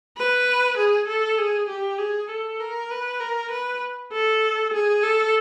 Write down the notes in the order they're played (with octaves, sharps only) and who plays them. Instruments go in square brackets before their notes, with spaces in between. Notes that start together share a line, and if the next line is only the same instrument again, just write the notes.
[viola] B4
G#4
A4
G#4
G4
G#4
A4
A#4
B4
A#4
B4
A4
G#4
A4